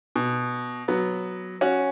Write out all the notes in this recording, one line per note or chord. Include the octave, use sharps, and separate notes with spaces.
B2
F#3 B3
C#4 F#4